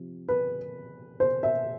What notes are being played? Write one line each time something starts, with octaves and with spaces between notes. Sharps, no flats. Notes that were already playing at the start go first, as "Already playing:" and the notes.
Already playing: C3 F3
B4
C5
E5